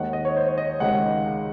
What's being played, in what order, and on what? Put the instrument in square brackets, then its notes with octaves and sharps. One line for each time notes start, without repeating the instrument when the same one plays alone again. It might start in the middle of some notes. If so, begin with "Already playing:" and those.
Already playing: [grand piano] D#2 D#3 G#3 F#5
D#5
C#5
C5
C#5
D#5
C#2 C3 D#3 G#3 F#5